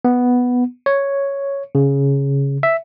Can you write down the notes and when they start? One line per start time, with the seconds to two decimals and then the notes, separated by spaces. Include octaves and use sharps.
0.05 B3
0.86 C#5
1.75 C#3
2.63 E5